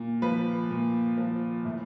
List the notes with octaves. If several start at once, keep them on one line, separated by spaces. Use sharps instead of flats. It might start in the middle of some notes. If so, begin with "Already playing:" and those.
Already playing: A#2
F3 B4
A#2
F3
A2